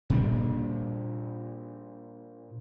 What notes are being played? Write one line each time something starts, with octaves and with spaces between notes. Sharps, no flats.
A#2 G3 D4